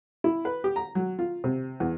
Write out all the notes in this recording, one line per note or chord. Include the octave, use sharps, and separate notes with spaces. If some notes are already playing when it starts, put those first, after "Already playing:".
E4
B4
G4
A#5
F#3
F4
C3
E2